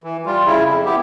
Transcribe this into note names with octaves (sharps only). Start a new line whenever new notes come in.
E3
G3 F4
C#3 E4
F2
B3 E4 G4